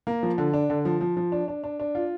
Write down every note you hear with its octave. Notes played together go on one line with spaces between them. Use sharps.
A#3
F3
D3
D4
D3
F3
F3
F3
D4
D4
D4
D4
F4